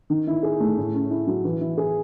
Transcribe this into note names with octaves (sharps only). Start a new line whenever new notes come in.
D#3
E4
G#4
A3
A2
C#4
E4
F#3
E3
E4
G#4